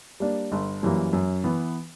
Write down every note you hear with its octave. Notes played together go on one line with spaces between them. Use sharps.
G3 A#3 D4
G1
F#2 E3 G3 A#3
F#2
E3 B3